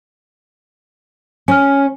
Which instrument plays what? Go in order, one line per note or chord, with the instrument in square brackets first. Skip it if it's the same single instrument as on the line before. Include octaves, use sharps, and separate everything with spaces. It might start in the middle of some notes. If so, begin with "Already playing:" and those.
[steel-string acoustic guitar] C#4 [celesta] G#5 F6